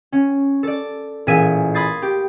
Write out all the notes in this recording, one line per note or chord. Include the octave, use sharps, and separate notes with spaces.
C#4
A4 D5
A1 A#2 G#4 E5 G#5 D#7
B5 C6 D#6 G#6 A6 C7
G4